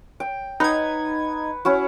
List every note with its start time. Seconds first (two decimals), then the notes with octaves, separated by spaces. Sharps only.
0.20 G5
0.60 D#4 B4 F#5 G#6
1.65 C#4 E4 F#4